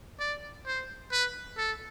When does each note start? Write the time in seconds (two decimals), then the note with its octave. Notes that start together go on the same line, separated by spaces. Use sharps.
0.20 D5
0.66 C5
1.12 B4
1.58 A4